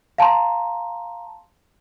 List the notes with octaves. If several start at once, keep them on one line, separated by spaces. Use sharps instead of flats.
F5 A5 A#5 C6